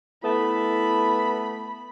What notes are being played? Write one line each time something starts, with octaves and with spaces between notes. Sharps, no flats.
A3 B3 E4 B5